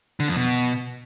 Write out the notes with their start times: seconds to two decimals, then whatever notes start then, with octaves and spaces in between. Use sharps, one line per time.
0.20 D3
0.28 F2
0.37 B2